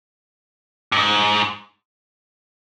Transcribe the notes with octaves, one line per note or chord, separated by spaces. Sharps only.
G2
G#2